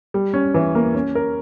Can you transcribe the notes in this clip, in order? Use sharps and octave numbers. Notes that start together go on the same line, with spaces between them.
G3
C#4
E3
A#3
C#4
A#4